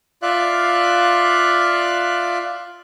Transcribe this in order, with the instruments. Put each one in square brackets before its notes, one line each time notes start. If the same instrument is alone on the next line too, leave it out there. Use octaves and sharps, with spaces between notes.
[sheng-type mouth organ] F4 D5 E5 F5 F#6